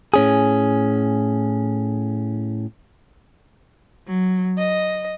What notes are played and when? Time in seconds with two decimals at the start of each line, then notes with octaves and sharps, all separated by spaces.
0.14 A2 C#4 G#4
4.07 F#3
4.57 D#5